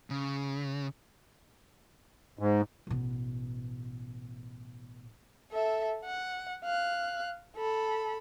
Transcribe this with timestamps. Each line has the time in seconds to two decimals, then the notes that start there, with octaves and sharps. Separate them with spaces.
0.10 C#3
2.39 G#2
2.87 A1 B2
5.52 A4 E5
6.05 F#5
6.64 F5 F#6
7.56 A4 B5